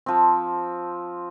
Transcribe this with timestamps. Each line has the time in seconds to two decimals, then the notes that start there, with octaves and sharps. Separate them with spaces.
0.06 F3 C4